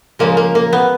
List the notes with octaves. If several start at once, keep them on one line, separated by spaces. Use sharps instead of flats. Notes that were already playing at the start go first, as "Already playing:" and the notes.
C#3 F3 G#3 A#3
A#3
A#3
B3